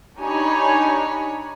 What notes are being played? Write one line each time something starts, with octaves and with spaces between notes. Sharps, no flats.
D4 D#4 G4 C#5 G#5 B5